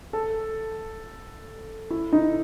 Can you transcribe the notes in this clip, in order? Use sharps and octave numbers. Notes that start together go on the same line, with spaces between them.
A4
E4
D#4